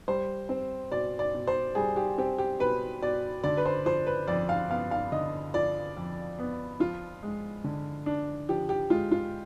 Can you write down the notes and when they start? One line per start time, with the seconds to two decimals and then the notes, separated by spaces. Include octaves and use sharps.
0.08 G3 C5
0.49 C4
0.91 B2 D5
1.19 D5
1.34 B2
1.47 C5
1.75 G3 G#4
1.96 G4
2.18 C4 G4
2.38 G4
2.60 B2 B4
3.02 B2 D5
3.44 D3 D5
3.57 B4
3.66 C5
3.85 F3 C5
4.07 B4
4.28 F2 D5
4.49 F5
4.70 B3 F5
4.91 F5
5.12 D3 D#5
5.54 F3 D5
5.97 F2
6.39 B3
6.80 F3 F4
7.23 G#3
7.64 D3
8.06 D4
8.49 F3 G4
8.69 G4
8.90 G#3 F4
9.11 F4